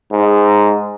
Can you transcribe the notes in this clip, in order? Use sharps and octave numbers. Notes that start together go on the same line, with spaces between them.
G#2